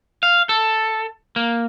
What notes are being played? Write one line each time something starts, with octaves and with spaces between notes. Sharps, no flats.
F5
A4
A#3